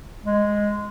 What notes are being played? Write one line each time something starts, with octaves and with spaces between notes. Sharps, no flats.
G#3